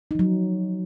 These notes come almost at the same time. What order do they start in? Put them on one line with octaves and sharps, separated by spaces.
D#4 F3 F#3